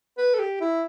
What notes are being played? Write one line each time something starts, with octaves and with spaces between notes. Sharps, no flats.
B4
A4
G4
E4